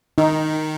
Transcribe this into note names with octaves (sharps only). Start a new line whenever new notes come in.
D#3 D#4